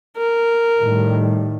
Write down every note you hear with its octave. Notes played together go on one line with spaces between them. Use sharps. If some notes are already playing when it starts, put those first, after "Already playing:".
A#4
A2 D#3 G3